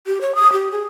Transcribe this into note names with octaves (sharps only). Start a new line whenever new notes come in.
G4
C#5
D#6
G4
G#4